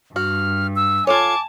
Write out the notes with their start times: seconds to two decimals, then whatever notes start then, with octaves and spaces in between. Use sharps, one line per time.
0.16 G2 F#4 F6
0.76 E6
1.07 F4 A4 C#5 G#5 A5 D6 G#6